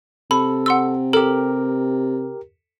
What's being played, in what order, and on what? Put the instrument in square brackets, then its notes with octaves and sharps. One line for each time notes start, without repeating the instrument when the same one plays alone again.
[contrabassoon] C3 [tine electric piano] A4 [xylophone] B5
[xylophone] F#5 C6 E6
[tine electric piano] G4 A#4 [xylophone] A4